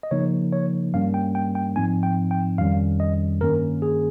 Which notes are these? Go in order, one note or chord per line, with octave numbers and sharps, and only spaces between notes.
D#5
C#3 F3 A#3 D#4 C#5
C#5
G2 G3 A#3 C#4 F5
G5
G5
G5
G#2 F3 C4 D#4 G#5
G5
G5
F2 D#3 G3 C#4 F5
D#5
G2 D#3 A#3 C#4 A#4
G#4